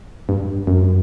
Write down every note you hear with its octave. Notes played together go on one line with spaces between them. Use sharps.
G2
F#2